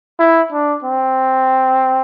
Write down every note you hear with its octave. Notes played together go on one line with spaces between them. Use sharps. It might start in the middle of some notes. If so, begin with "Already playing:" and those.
E4
D4
C4